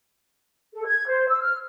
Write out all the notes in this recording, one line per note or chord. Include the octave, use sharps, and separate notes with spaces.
A4
G#6
C5
E6
F6